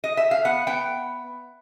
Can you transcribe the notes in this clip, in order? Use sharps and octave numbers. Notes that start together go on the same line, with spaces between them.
D#5
E5
F5
B3 F#5
B3 G5